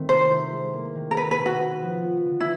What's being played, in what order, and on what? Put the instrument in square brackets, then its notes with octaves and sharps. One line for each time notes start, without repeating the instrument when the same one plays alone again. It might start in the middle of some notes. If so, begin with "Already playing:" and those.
Already playing: [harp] D#3 A3 C4
[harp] C3 [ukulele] C5
[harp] E4
G#3
A#3
D#3
[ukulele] A#4
[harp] B3 [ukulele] B4
[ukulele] B4
[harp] B2
[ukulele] F#4
[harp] C4
F3
B3
D3
[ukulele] E4